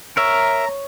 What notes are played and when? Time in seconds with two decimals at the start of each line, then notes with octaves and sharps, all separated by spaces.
0.17 A#4 C#5 E5 A#5